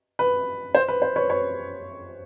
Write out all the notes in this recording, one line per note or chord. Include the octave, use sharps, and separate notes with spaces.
B4
C5
B4
C5
B4 C#5
B4 C#5